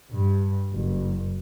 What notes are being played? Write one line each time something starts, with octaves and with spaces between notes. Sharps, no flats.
G2
F#1